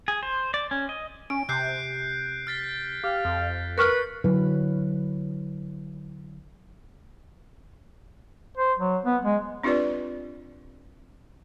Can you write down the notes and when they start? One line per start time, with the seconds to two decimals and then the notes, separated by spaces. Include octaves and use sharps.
0.08 G#4
0.23 C5
0.54 D5
0.71 C#4
0.89 D#5
1.30 C#4 D7
1.49 C3 F#6 G6 C7
2.47 F6 A6 B6
3.04 G4 F5
3.25 F2
3.78 A#4 B4 C#6 F6 C#7
4.24 D3 F#3 E4 B4
8.57 C5
8.79 F#3
9.05 B3
9.25 G#3
9.63 C4 D4 F4 G4 B4 D5